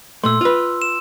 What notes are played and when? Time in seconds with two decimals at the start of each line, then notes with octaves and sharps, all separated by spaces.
0.24 A#2 A3 C6 E6
0.41 F4 B4
0.82 E7